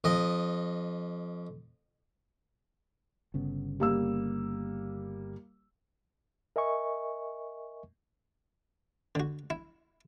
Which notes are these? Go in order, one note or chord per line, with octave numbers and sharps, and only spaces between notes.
F2 D#5
G1 C#3 B3
G3 A#3 E6
A#4 D#5 E5 G#5 C#6
D3 F#4
E4